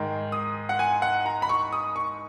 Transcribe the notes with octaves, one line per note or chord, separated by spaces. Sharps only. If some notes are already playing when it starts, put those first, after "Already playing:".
Already playing: G#2 D#3 G#3
D#6
F#5
G#5
F#5
A#5
B5
C#6
D#6
C#6